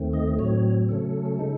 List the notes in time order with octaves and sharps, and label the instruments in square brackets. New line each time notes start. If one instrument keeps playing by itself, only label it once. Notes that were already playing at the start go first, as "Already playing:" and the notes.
Already playing: [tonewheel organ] D#2 D#3 A3 C4
D#5
A2 F#3 C4 C#5
C#3 F#3 A3 C#4 A4
C#3 G#3 D#4